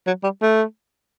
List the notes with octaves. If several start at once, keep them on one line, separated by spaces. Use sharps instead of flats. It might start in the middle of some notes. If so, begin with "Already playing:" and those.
F#3
G3
A3